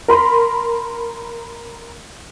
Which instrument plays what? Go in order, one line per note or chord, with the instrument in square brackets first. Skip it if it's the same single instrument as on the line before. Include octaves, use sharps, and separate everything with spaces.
[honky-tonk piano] A#4 B5 C6